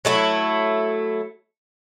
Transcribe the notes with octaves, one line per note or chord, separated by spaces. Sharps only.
F#3 A3 E4